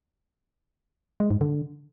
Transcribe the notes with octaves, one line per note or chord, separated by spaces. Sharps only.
G#3
G#2
D3